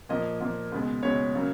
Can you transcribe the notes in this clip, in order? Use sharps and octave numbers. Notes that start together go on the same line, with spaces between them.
A#2 F3 A#3 D#5
A#2 F3 A#3
C#2 B2 G#3
C#2 B2 G#3 C#5
C#3 F#3 A#3